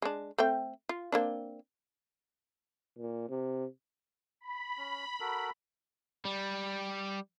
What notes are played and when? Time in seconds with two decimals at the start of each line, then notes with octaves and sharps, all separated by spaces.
0.02 G#3 D4
0.38 A3 C4 G5
0.89 F4
1.12 A#3 C4 D4
2.98 A#2
3.29 C3
4.41 B5
4.78 C#4
5.20 F#4 A4 A#4
6.25 G3